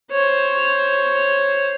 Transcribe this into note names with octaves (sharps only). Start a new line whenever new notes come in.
C5 C#5